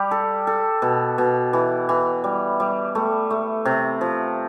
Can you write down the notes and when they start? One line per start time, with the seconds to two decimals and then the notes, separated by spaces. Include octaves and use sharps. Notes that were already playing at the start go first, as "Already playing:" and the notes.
Already playing: G3 G4
0.11 A4
0.47 A4
0.82 B2
1.18 B2
1.53 E3
1.89 E3
2.24 G3
2.60 G3
2.95 A3
3.30 A3
3.65 C3
4.01 F3